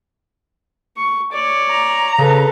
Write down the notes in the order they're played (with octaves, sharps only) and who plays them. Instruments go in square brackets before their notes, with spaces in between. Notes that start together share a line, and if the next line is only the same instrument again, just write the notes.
[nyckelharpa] C#6
C#5 D5
[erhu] A#5
[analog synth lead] C#3 [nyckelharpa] A4 B4